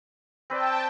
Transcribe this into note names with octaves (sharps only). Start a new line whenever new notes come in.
C4 B4 D5 G5 A5